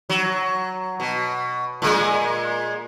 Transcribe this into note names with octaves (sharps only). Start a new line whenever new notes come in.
F#3
B2
A#2 G#3